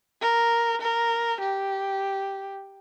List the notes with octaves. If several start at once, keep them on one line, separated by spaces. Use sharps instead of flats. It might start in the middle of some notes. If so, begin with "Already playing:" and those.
A#4
A#4
G4